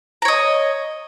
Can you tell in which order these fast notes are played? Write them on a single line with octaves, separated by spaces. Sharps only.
A#5 C#5 D#5